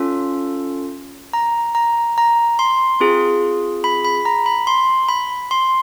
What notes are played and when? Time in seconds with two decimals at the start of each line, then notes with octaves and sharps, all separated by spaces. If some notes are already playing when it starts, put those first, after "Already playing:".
Already playing: C#4 F4 A4
1.33 A#5
1.75 A#5
2.18 A#5
2.59 C6
3.00 C4 F4 G#4
3.84 B5
4.05 B5
4.25 A#5
4.46 B5
4.67 C6
5.09 B5
5.51 C6